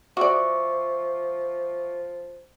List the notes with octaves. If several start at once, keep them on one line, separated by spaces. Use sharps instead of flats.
F3 F#4 D5 E5 C#6 D6